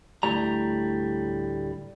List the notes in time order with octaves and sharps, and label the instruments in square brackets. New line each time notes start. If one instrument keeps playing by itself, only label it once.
[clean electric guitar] D2 A2 G3 A#5